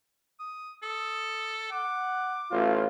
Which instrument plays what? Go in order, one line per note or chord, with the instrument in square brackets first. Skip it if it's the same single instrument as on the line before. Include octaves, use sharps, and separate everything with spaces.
[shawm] D#6
[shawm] A4 [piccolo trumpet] D#6
[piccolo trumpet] F#5 [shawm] D6
[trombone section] A1 A2 F4 [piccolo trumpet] F5